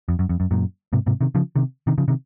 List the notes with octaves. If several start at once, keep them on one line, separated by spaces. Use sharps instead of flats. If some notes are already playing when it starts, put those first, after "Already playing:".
F2
F#2
F2
F#2
F#2 A#2
G#2 C3
G#2 C3
C3 D#3
C#3 F3
C3 D#3
C3 D#3
C#3 F3
C3 D#3